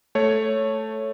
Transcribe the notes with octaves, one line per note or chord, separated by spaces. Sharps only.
A3 C#5